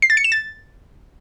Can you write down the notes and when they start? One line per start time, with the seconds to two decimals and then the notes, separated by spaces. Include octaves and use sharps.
0.02 C7
0.10 A6
0.17 C#7
0.24 E7
0.32 A6